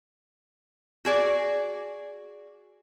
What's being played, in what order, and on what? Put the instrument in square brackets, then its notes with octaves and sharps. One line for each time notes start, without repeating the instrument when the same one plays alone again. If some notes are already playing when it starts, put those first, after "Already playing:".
[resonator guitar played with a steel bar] F#4 G#4 D5